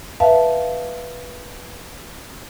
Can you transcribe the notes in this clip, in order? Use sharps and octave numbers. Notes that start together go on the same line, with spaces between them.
B4 E5 F5 A5